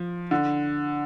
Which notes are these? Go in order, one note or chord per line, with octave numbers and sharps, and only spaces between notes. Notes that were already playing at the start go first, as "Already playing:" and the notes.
Already playing: F3
D3